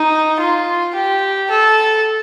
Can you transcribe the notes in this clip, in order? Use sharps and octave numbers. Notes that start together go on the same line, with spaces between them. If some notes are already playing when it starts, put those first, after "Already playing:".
Already playing: D#4
F4
G4
A4